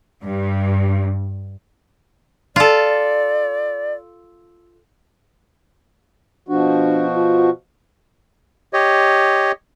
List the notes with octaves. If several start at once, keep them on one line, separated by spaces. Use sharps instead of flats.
G2
F4 A4 D5
B2 F3 D4 F#4
F4
G4 C#5 D#5